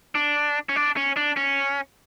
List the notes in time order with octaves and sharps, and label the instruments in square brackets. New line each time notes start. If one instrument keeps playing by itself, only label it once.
[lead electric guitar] D4
C#4
D4
C#4
D4
C#4